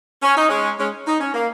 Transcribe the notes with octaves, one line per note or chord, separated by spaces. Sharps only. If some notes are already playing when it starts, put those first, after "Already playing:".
C#4
D#4
G#3 C#4
G#3 C#4
D#4
C#4
A#3